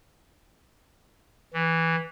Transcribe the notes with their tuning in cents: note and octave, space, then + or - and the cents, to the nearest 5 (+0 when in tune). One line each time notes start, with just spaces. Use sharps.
E3 -5